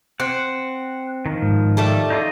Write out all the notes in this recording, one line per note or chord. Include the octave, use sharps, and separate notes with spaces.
C4 F#5
D#3 F3
G#2
G3 A3 A4
D#4 F4 D#5